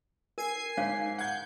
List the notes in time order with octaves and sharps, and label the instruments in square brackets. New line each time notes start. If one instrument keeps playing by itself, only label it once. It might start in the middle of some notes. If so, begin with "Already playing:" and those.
[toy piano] A#4 [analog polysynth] G#5 C7
[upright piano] G#2 [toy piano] C#5 F5
[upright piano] F#5 G#6 [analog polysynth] G6